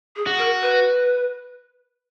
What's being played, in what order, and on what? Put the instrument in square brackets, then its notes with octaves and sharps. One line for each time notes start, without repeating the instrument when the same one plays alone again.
[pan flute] G#4
[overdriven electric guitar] F#4
[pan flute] A#4
B4